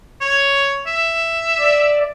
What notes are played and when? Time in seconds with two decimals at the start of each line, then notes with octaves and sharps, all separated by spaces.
0.21 C#5
0.87 E5
1.59 D5